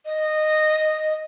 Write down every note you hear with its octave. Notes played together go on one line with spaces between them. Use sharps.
D#5